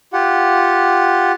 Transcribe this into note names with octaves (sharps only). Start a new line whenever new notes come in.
F4 G4 F#5